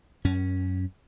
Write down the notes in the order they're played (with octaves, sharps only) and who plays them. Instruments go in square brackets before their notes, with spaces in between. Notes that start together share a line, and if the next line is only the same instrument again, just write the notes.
[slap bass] F#2 C#4